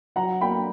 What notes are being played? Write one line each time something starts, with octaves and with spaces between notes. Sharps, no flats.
F#3 F#5 A#5
A#3 G5 B5